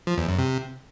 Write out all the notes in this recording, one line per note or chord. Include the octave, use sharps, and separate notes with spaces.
F3
E2
F#2
C3